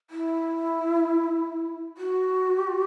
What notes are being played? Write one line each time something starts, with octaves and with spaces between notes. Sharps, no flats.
E4
F#4